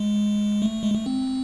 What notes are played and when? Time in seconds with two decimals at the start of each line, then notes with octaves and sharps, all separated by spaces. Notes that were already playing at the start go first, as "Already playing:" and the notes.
Already playing: G#3
0.62 A3
0.83 G#3
0.94 A3
1.06 C4